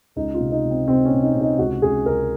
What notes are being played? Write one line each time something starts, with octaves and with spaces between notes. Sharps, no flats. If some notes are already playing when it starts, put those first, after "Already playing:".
C#2 D#4
F4
C3
D#4
C3
C4
C3 C4
C#4
C3
D#4
C3
D#4
C#2 F#4
C#2 G#4
C#2 A#4